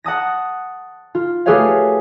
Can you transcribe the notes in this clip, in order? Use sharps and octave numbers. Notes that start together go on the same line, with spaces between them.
F#5 A5 D#6 A#6
F4
A3 G4 G#4 B4 C#5 F5